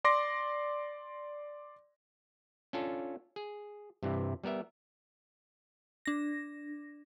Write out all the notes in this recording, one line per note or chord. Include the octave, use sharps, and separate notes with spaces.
D5 C6 D6 A#6
C#4 D4 F4 A4
G#4
G2 C3 E3
G3 B3 A#4 E5
D4 A#6